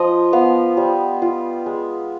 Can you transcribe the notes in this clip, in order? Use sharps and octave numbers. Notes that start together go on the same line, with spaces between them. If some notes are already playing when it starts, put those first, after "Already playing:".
Already playing: F3 F4 D#5
B3 F5
G3
F4
G#3